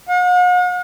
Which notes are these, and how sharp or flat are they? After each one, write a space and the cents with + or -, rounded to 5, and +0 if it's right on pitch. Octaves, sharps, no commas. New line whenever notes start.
F#5 -45